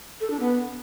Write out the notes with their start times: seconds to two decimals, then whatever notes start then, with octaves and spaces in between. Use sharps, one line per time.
0.21 A4
0.30 D4
0.40 B3